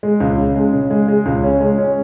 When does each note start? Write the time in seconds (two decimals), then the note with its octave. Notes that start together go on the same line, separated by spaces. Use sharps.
0.03 G#3
0.20 C#2
0.38 C#3
0.56 G#3
0.73 C#3
0.90 G#3
1.08 G#3
1.26 C#2
1.43 C#4
1.60 G#3
1.78 C#4